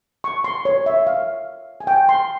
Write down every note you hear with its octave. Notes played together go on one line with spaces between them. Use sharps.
C#6
C6
C#5
E5
F5
G#5
G5
C6